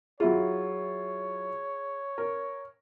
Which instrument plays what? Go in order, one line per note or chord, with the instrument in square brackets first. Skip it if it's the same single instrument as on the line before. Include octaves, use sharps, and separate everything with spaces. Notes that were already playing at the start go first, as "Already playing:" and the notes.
[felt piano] F#3 E4 F4 [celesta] G#4 [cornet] C#5
[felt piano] A#4